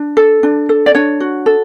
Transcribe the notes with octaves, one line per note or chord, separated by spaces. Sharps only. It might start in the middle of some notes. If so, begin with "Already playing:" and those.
Already playing: D4
A4
D4
A4
D5
D4 C#5
F#4
A4